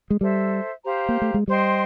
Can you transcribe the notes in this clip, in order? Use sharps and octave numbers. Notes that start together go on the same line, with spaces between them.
G#3
G3 A4 C5 E5
G4 C5 F5 A#5
A#3
A3
G#3
G3 C5 D#5 G5 C6